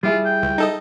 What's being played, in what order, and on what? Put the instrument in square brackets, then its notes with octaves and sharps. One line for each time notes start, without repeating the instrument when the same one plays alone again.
[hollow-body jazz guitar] G3 E4 G#4 [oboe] F4
[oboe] G5
[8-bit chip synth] C#2
D#4 A4 D#5